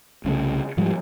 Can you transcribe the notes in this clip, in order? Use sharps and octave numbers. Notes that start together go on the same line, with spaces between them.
C2 C#3 F3 A3
G#2 F3 G3